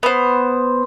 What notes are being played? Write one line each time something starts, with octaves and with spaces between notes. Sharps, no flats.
B3 C5